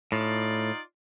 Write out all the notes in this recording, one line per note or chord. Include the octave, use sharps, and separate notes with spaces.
A2 D#4 F4 D5